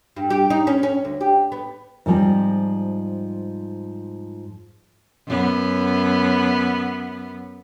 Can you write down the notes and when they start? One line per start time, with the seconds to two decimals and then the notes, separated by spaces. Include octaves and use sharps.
0.17 G2
0.30 G4
0.50 D#4
0.67 C#4
0.83 C#4
1.05 D2
1.21 G4
1.52 B3
2.06 G#2 F3 G3 C4
5.27 F#2 B3